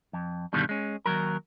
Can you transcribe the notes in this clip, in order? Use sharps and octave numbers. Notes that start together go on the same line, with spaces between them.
F2
G2 B2 D3 D#3 G3
G#3 C#4
D#2 G#2 F#3 A#4